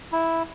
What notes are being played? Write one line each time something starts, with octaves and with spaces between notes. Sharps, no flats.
E4